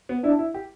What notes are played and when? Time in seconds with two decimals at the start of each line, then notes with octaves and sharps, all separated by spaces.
0.09 B3
0.24 D4 E4
0.39 E4
0.54 G4